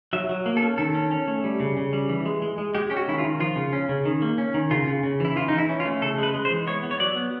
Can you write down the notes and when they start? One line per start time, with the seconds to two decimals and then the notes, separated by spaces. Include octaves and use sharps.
0.13 F#3 E5
0.29 F#3
0.46 A#3
0.57 A4
0.62 C#4
0.78 D#3 A4
0.95 C#4
1.11 C#4
1.28 A3
1.44 G3
1.60 C#3
1.77 C#3
1.93 G3
2.09 E3
2.26 G#3
2.42 G#3
2.58 G#3
2.75 G#3 G4
2.90 C#4 G4
2.97 F#4
3.07 D#3 E4
3.18 F4
3.24 D#3
3.40 F3 F4
3.56 C#3
3.73 C#4
3.89 C#3
4.05 D#3
4.22 A#3
4.38 C#4
4.54 D#3
4.71 C#3 F4
4.87 C#3
5.03 C#3
5.20 E3 E4
5.36 E3 F4
5.48 E3 D#4
5.58 E4
5.69 C#4
5.80 F4
5.85 A3
6.02 C#3 A4
6.18 G#3 B4
6.34 G#3
6.45 C5
6.51 E3
6.67 B3 C#5
6.83 B3
6.91 C#5
7.00 F#3 D5
7.16 B3